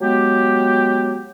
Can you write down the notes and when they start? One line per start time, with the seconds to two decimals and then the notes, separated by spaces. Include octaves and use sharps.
0.01 F#3 G#3 B3 G4